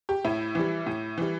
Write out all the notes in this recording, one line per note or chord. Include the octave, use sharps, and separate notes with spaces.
G4
A2 E4
E3 G3
A2
E3 G3